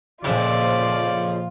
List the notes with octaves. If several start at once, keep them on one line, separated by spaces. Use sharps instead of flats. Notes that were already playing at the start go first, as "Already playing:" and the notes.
F2 A#2 C#3 F3 F4 D5 E5